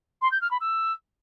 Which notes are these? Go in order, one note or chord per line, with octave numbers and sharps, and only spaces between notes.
C6
G6
F6
B5
E6